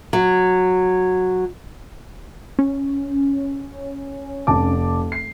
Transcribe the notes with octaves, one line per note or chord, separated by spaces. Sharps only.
F#3
C#4
F1 A5 D6
C7